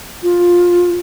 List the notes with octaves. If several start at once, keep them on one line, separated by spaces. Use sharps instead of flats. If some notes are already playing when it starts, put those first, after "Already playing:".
F4